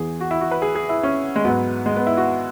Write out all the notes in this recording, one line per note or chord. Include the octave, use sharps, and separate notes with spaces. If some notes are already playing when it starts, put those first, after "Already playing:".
Already playing: E2 E3 G#4
F#4
E4
F#4
B4
G#4
G#4
E4
C#4
G#3
G#2 F#3 B3
G#3
B3
E4
F#4